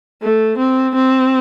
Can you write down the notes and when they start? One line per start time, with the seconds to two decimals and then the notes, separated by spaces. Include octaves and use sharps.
0.22 A3
0.58 C4
0.95 C4